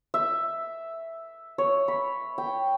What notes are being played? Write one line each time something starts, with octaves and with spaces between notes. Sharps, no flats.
E5
C#5
B5
G5